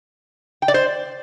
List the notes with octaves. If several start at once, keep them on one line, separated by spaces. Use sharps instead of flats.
G5
D5
C5